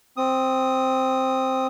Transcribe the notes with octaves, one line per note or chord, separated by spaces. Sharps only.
C4 D#6